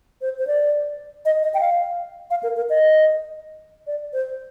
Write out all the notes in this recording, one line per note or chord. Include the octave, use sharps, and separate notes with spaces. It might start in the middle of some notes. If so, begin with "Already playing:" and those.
C5
C5
D5
D#5
D#5
G5
F5
F5
A#4
A#4
D#5
D5
C5